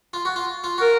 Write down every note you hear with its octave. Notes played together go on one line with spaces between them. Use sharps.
F4
F#4
F4
F4
F#4 A#4